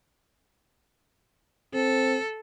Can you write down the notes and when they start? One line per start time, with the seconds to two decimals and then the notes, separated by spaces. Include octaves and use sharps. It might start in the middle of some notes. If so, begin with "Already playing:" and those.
1.74 C4 A4